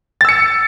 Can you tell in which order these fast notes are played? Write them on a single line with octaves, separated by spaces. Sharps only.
A6 E6 C#7